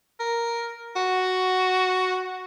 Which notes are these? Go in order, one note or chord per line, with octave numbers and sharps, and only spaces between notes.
A#4
F#4